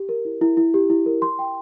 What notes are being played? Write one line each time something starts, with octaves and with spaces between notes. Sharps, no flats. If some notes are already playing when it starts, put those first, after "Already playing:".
Already playing: G4
A#4
E4
E4
E4
G4
E4
A#4
C6
G5